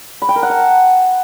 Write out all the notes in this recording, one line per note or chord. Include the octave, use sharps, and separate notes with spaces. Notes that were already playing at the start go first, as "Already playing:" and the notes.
B5
G5
A#4
F#5
A5